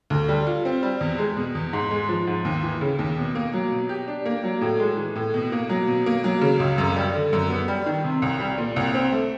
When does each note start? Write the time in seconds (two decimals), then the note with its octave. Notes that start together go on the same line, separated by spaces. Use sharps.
0.10 D2
0.29 G3
0.47 F4
0.65 C4
0.83 G3
1.01 E2
1.18 G#3
1.37 B2
1.55 E2
1.73 G#2
1.91 G#3
2.09 F3
2.27 G#2
2.45 D#2
2.63 E3
2.81 C#3
2.99 D#2
3.17 B2
3.35 A#3
3.54 F#3
3.71 B2
3.89 G4
4.08 D4
4.26 A#3
4.44 F#3
4.61 A2
4.80 G#3
4.97 E3
5.15 A2
5.34 B2
5.52 A#3
5.69 F#3
5.87 B2
6.06 A#3
6.24 F#3
6.41 C#3
6.60 C#2
6.78 F#2
6.96 G3
7.14 D3
7.33 F#2
7.50 B3
7.68 G3
7.86 D#3
8.04 C3
8.22 C2
8.40 G3
8.58 A#2
8.76 C2
8.94 C4
9.12 A3